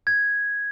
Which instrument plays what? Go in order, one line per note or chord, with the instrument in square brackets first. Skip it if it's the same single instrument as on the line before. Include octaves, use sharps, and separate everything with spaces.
[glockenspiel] G#6